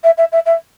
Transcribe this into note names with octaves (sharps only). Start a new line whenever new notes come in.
E5
E5
E5
E5